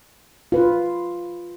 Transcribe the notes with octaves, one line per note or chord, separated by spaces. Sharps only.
F4 B4